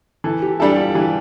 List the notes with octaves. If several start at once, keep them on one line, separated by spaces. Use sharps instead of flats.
E3 A4
G4
G3 D4 E4 A4
F4
E3 G4